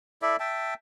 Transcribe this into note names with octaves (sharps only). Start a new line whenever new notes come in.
E4 A4 D5 E5
E5 G5 A5